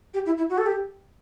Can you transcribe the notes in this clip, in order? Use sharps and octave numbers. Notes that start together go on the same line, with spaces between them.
G4
E4
E4
F#4
A4
G4